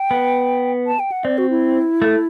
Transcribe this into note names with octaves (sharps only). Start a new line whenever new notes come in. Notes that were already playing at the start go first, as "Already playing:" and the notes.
Already playing: G5
B3
A5
G5
F#5
C4 D5
F#4
E4
A3